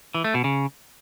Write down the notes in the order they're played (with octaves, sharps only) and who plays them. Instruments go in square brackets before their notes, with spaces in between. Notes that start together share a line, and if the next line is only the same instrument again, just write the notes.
[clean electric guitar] E3
A3
B2
C#3